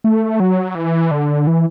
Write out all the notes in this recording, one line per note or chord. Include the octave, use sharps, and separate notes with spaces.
A3
F#3
E3
D3
E3